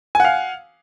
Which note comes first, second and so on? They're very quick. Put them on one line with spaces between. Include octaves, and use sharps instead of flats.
G#5 F#5 F5